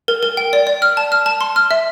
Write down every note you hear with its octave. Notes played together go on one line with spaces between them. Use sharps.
A#4
A#4
G5
D5
D5
F6
A5
F6
A5
C6
F6
E5